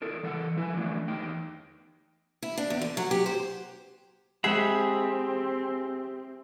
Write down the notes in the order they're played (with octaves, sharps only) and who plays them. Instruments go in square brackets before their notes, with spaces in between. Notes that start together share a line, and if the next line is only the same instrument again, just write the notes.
[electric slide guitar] E4 A4 A#4
E3 A4 F#5
F3 E4 B4 G#5
D3 E3 F3 A3 D4 E4
E2 D#4 G5
[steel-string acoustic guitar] E4
D4
E2
D3
F#3
G4
C5
[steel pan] G#3 F#5 [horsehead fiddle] C4 [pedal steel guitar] G4 E5 B5 [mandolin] G#4